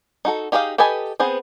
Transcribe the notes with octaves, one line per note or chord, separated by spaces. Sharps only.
D#4 F#4 A4
D#4 G4 G#4 D#5 F5
G4 A4 B4 D#5 G#5
B3 C4 G#4 C5